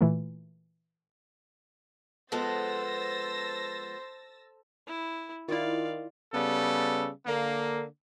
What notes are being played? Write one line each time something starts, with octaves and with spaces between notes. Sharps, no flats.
A#2 E3 A3
F3 G#3 B3 A4 C5 E6 A6 A#6
E4
D#3 E4 F4 D5 F5
C#3 G3 B3 A4
D3 A#3